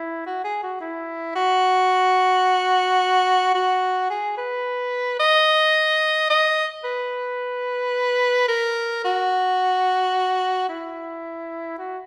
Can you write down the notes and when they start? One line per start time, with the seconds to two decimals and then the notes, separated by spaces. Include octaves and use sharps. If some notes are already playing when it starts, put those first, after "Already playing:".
Already playing: E4
0.26 F#4
0.44 G#4
0.63 F#4
0.81 E4
1.35 F#4
3.55 F#4
4.10 G#4
4.37 B4
5.20 D#5
6.30 D#5
6.84 B4
8.48 A#4
9.04 F#4
10.69 E4
11.78 F#4